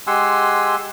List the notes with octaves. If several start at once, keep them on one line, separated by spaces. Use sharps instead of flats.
G#3 G4 F#5 G#5 C6 E6